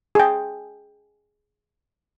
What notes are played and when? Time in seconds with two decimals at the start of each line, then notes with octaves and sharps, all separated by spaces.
0.15 G#4 G5